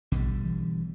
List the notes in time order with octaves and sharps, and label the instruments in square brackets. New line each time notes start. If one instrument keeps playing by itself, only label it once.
[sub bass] A#1 [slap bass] B2 D3 G3
[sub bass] E3